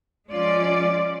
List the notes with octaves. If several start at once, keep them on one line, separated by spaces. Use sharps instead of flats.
F3 G#3 C#4 F4 D5